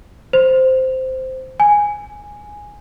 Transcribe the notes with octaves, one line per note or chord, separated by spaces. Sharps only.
C5
G#5